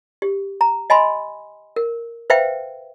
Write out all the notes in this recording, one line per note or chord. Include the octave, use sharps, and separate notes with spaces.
G4
A#5
D#5 G#5 B5 C6
A#4
B4 C5 E5 F5 G5